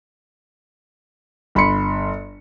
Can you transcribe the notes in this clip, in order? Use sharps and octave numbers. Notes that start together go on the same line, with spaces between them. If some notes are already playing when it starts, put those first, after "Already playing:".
G1 B5 C6 C#7